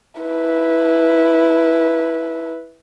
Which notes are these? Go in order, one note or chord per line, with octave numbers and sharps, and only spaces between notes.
E4 B4